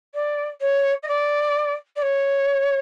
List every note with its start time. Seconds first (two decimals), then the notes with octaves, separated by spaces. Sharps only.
0.14 D5
0.61 C#5
1.03 D#5
1.08 D5
1.96 D5
2.02 C#5